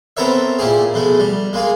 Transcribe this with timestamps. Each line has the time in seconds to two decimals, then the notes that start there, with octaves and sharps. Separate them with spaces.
0.17 B3 C4 A4 A#4 C#5 E5
0.59 A#2 E4 G4 G#4
0.94 B2 G#3 A3
1.20 G3
1.53 G#3 A#3 G#4